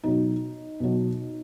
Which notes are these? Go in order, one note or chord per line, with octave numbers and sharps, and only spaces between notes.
B2 F#3 D#4
B2 F#3